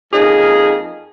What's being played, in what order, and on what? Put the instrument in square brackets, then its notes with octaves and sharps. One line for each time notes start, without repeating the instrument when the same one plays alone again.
[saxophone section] F2 A#3 C#4 D#4 G#4